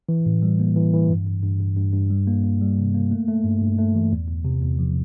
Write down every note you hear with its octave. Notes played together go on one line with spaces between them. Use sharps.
E3
A2
G3
A#3
E3
E3
G2
G2
G2
G2
G2
G2
G3
A#3
A#3
G3
C3
A#3
A3
A3
G2
G2
A3
E3
E2
E2
C3
E2
F3